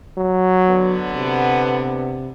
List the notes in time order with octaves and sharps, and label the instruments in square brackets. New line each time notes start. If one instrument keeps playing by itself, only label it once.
[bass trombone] F#3
[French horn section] D3 B3
[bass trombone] C3